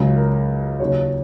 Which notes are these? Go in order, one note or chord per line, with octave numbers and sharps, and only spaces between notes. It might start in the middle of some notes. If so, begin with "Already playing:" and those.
Already playing: C#2 C#3 F#3
A#4
D#2 C#3 F#3 C#5